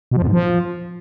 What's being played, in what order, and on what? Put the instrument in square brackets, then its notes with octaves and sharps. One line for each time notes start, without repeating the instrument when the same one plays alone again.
[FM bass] B2
F3
F2
G#2
F3